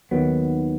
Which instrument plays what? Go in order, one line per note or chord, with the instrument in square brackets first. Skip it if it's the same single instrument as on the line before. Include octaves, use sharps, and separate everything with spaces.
[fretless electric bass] D#2 D#3 F#3 B3